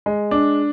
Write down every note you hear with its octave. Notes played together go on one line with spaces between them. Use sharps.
G#3
D4